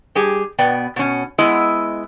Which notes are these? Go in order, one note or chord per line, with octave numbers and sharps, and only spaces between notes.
G3 G4 G#4
B2 B3 D5 G5
B2 C#4
G#3 B3 E4 D#5